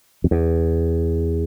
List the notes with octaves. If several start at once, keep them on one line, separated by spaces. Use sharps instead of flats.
F2
E2